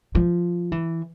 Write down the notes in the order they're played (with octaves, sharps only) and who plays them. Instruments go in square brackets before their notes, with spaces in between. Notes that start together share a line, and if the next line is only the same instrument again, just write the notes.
[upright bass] F3
E3